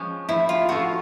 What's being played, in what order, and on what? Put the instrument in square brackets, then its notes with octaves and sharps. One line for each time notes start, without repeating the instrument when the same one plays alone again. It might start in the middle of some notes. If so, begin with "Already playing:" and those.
Already playing: [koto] F3 G#3 C#4
[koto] F3 [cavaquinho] E4
[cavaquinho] F4
[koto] A3 C#4 F4 [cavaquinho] F#4